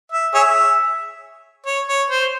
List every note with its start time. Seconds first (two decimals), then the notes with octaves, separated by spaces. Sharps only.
0.12 E5
0.34 G#4 C#5 E5
1.66 C#5
1.88 C#5
2.10 C5